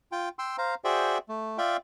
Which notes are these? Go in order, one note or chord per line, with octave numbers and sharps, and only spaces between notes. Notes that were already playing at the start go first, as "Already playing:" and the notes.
F4 G5
G5 C6 E6
C5 F5 A#5
F#4 G#4 C5 D5 E5 G5
A3
F4 D5 E5 F5 G5